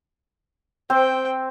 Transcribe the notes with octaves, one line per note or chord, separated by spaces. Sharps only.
C4 C5 G5